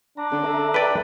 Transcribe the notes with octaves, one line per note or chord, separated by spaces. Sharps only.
D4 A#5
D3 C#4 A4
A4 E5 A#5
B4 D5 G5